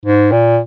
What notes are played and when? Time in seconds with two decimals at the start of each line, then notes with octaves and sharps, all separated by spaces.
0.06 G#2
0.32 A#2